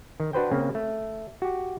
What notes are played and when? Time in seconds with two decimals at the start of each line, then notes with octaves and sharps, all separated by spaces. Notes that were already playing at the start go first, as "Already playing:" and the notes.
0.20 D#3
0.33 D4 F#4 B4 C5 G5
0.51 C#3 A#3 C4
0.75 A3
1.42 F#4 G4